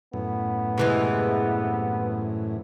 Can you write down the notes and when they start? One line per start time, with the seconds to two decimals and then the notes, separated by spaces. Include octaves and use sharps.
0.13 F#2 A2 B3
0.78 C3 E3 G#3